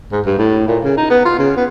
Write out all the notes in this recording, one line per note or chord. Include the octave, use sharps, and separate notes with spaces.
G#2
G2
A2
A#2
C#3
D#4
B3
F4
C#3
B3